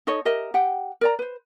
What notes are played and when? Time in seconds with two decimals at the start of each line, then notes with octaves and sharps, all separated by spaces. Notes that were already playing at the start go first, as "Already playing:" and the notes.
0.07 D#4 A4 C#5 D#5
0.25 G4 A#4 D#5 E5
0.54 G4 F#5 G5
1.01 A#4 D5 A#5
1.19 B4 C5